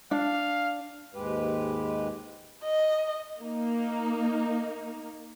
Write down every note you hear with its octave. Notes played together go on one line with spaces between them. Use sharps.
D4 F5
D#2 G#2 G#3 G4 B4
D#5
A#3 D#4